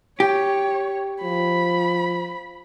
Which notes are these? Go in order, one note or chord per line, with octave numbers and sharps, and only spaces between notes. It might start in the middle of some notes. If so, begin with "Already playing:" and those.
G4 C#5
F3 B5